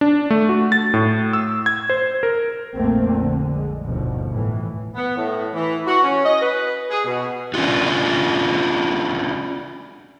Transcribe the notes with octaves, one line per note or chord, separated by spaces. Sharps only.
D4
A3
F#4
A6
A2
E6
G#6
C5
A#4
A#1 F2 A3 A#3 C4
A#1 D3
G#3
G1 D#2 B2 F3
A2 E3
B3
A2
E3
F#4
C#4
D#5
B4
G#4
B2
C#4 D4 F4 F#4